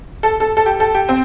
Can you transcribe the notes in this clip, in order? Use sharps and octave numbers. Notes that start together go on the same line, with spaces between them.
A4
A4
A4
G4
A4
G4
C4